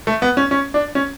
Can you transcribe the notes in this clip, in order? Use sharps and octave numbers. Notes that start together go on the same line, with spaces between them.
A3
B3
C#4
C#4
D4
C#4